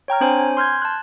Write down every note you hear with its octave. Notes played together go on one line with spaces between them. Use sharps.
C#5 G5 A#5 F6
C4 D4 C5 C#5 G#5
G#5
C6 F6 G6 G#6
A5 F#6